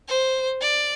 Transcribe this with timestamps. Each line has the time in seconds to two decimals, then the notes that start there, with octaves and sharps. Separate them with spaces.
0.09 C5
0.62 D5